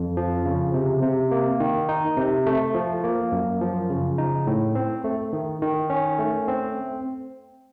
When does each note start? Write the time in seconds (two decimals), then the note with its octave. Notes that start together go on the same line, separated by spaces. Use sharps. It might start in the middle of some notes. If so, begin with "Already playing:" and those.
Already playing: F2
0.17 F3
0.45 C#3
0.74 C3
1.03 C3
1.31 A#3
1.60 D#3
1.89 D#4
2.17 C3
2.46 A3
2.75 F3
3.04 A#3
3.32 F#2
3.61 F3
3.90 C#3
4.18 D#4
4.47 A2
4.75 C4
5.04 A3
5.33 D#3
5.62 D#3
5.90 C#4
6.19 A3
6.48 C4